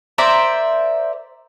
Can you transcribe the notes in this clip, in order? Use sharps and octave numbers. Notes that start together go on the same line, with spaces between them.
A#4 C5 D5 E5